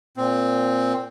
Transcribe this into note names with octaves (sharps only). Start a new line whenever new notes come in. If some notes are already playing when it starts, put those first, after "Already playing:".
A#2 C4